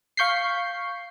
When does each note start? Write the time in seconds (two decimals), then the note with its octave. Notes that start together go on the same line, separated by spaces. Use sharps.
0.17 F5 C#6 G6 B6 C7